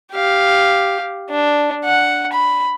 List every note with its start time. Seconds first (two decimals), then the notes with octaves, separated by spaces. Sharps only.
0.13 G4 F5
1.30 D4
1.84 F#5
2.33 B5